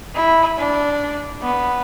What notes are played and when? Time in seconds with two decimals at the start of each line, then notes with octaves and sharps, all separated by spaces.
0.15 E4
0.58 D4
1.43 B3